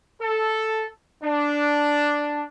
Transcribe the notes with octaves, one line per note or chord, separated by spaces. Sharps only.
A4
D4